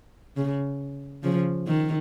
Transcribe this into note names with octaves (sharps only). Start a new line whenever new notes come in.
C#3
C#3 F3
D#3